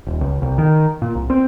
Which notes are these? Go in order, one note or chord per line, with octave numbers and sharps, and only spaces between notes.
D#1
C#2
C2
D#3
A#2
C2
C4